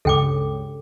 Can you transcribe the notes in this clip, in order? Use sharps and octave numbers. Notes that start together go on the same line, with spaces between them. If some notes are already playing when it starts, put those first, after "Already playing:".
C#2 G2 C#3 A4 G5 D6